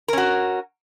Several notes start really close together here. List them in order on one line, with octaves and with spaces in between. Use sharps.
A#4 C#4 F#4